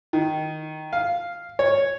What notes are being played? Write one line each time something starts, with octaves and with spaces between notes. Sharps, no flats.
D#3
F5
C#5